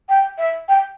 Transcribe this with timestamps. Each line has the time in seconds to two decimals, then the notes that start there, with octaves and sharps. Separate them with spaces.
0.09 G5
0.38 E5
0.68 G5